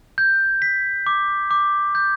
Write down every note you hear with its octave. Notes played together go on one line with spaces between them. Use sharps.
G6
B6
D6
D6
G6